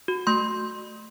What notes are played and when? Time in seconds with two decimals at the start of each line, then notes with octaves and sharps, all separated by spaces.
0.08 F#4
0.27 A3 C6